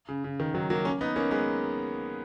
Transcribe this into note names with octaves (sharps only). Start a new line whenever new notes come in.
C#3
C#3
D#3
D#3 F#3
F#3 A#3
A#3 C#4
B3 D#4
A#3 C#4
G#3 B3